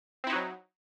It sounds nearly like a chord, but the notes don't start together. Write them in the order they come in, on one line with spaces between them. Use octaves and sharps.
C4 E4 D#4 F#4 F#3